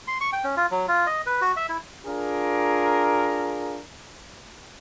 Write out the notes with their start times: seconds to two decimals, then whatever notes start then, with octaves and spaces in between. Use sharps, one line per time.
0.07 C6
0.21 C#6
0.33 G5
0.44 C#4
0.57 F4
0.71 F#3
0.88 F4
1.06 D#5
1.26 B4
1.42 F#4
1.57 E5
1.69 E4
2.07 D4 F4 G#4 A#4